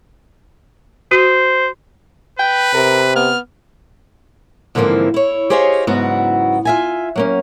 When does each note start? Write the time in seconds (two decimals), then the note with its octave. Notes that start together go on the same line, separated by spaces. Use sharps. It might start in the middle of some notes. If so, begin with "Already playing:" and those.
1.11 F#4 C5
2.39 B4 G5
2.74 C3 A#4
3.16 B3 F6
4.75 G#2 D3 E3 F3 A#3 C4
5.14 E4 C#5
5.50 G4 G#4 C5 C#5 D#5 F5
5.87 G#2 C#3 F#3 B3 E4 F#4
6.65 F4 E5 G#5
7.16 F#3 A#3 C#4